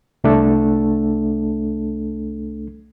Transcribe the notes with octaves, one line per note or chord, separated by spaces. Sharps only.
C2 A3 D4 A4